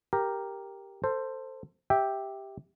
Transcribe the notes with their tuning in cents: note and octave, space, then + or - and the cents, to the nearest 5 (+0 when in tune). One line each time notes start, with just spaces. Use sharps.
G4 +0 A#4 +0
A4 +25 C5 +0
G4 +0 E5 -10 G5 +0